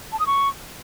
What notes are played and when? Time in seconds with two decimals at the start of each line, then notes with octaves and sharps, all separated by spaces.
0.12 A5
0.19 D#6
0.27 C#6